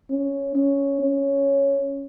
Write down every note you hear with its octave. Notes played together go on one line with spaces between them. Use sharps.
C#4
C#4
C#4